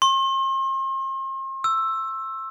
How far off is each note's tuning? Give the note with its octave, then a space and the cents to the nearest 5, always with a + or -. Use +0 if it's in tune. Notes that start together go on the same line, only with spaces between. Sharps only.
C6 +40
E6 +5